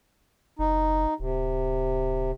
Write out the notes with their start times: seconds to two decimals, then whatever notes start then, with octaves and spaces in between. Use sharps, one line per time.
0.59 F#1 D#4
1.20 D1 C3